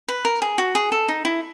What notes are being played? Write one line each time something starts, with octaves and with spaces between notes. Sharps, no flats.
B4
A#4
G#4
F#4
G#4
A4
D#4
E4